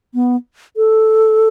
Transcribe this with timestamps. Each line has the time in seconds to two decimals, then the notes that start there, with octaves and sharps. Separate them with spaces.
0.14 B3
0.77 A4